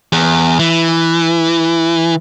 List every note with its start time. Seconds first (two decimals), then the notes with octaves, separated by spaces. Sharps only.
0.12 E2
0.59 E3